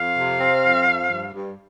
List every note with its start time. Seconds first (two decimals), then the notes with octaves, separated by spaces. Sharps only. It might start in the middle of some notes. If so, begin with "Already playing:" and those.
Already playing: F2 F5
0.17 C3
0.40 C4
0.64 F2
0.87 F3
1.09 G2
1.33 G2